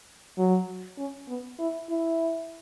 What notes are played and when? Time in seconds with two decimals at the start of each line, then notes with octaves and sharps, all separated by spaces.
0.38 F#3
0.98 C#4
1.28 B3
1.59 E4
1.90 E4